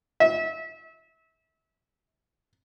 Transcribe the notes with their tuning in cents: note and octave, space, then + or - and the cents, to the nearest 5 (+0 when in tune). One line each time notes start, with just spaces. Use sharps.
E5 -30